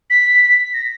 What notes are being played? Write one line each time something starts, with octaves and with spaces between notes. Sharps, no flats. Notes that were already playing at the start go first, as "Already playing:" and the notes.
B6
A#6